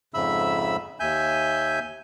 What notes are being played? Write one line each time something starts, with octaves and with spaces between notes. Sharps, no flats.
F2 G#2 C#3 E5 B5 E6
D#2 E5 G#5 G6